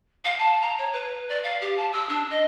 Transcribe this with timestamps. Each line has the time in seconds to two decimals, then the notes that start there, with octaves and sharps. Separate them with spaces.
0.25 F5
0.39 A5
0.61 A#5
0.78 C#5
0.93 B4
1.29 D5
1.43 F5
1.61 G4
1.77 A5
1.92 E6
2.09 D4
2.30 D#5